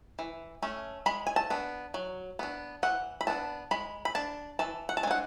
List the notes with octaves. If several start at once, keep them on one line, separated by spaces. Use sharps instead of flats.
E3
A3 C#4
G#3 B5
G#5
A5
B3 D4
F#3
B3 D4
E3 F#5
B5
B3 D4 A5
G#3 B5
B5
D4 A5
E3 A5
F#5
A5
G#3 D4 F#5 G#5